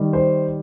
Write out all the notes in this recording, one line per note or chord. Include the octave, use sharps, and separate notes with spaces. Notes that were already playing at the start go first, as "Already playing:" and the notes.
Already playing: D#3 G3
C5